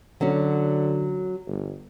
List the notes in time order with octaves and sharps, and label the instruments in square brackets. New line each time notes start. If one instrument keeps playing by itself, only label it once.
[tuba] D3 [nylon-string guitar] F#3 C#4
[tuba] G1